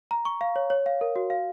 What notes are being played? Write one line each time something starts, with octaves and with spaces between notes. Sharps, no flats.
A#5
C#6
F5
C#5
C#5
F5
A#4
F#4
F5